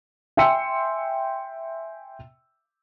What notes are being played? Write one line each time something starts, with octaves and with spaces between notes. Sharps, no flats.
E5 G5 G#5 C6 E6 C#7